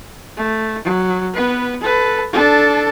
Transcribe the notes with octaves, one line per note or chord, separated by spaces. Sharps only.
A3
F#3
B3 B4
A4 B4
D4 A4